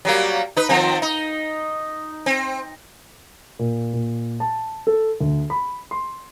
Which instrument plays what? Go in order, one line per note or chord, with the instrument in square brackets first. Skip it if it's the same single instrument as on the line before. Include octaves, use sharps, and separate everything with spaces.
[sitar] F#3 G3 A#3
D#4 B4
D#3 F3 C4
D#4
C4
[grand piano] A#2
A#2
A5
A4
D2
B5
C6